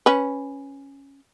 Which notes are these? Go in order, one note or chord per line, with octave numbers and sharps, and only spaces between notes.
C#4 B4